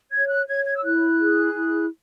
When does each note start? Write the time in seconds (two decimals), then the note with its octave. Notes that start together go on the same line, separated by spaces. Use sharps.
0.11 C#5 G#6
0.29 F#6
0.48 C#5 G#6
0.65 G#6
0.75 E6
0.83 E4 F#6
1.19 G#4
1.55 E4